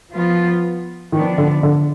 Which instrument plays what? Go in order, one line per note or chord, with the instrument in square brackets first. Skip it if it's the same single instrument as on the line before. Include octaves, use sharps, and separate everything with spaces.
[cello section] F3 B3 F4
[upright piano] D#3 [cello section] F3 B3 D4
[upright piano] D3
D3